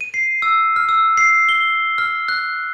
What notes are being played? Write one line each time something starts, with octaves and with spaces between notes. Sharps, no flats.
D#7
C7
E6
F6
E6
C7
G7
F6
F#6